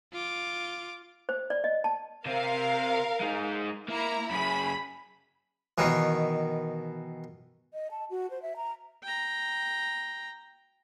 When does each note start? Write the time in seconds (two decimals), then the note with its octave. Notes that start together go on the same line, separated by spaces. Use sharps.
0.13 F4 D6
1.29 C5
1.50 D5
1.64 D#5
1.84 A5
2.26 C3 C4 A#4 F5
3.20 G#3 D#4
3.88 A#3 E4 A#5
4.31 F#2 G#4 B5
5.78 B2 D#3 E3
7.73 D#5
7.91 A5
8.10 F#4
8.30 C5
8.42 E5
8.56 A#5
9.03 G5 A#5